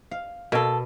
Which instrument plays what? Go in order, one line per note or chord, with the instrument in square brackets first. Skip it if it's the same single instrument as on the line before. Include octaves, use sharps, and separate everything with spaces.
[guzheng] F5
[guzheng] B2 [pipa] A#3 A4